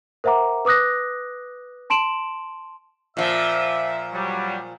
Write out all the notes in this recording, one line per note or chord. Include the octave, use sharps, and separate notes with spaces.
A#4 C5 E5 F#5 A#5 D6
B4 D6 D#6 F#6 A#6
A5 C6 D7 E7 F#7
A#2 F3 E5
F#3 G3